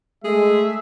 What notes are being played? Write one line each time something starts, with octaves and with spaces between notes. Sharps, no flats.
G#3 A3 G#4 E5